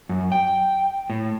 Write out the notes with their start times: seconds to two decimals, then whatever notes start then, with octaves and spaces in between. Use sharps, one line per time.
0.09 F#2
0.32 G5
1.10 A2